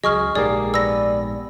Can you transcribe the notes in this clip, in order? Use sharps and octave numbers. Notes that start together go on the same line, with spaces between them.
C#2 F#3 G#4 D#5 C#6 F6
A#1 G#2 A#3 G4 G#4 D5
B3 D5 E6 A#6